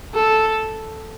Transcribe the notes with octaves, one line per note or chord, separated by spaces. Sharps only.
A4